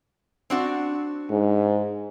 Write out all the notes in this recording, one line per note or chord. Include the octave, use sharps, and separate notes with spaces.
C4 D4 F#4
G#2